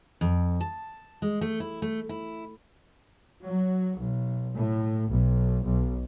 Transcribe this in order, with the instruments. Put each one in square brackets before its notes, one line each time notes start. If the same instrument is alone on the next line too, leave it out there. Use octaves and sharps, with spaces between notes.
[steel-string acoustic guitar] F2
A5
G#3
A3
E4
A3
E4
[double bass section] F#3
B1
A2
B1
B1